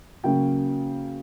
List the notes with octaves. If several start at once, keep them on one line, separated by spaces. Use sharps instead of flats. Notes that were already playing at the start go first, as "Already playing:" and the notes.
C#3 F#3 A#3 C#4 G5